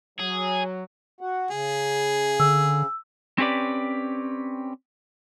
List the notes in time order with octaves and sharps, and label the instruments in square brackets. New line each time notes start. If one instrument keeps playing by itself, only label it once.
[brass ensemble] F#3 [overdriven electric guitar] G#4
[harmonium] F#4 F#5
[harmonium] C#3 [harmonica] G#4
[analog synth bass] D3 [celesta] E6
[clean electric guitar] C4 C#4 G4 B4 D5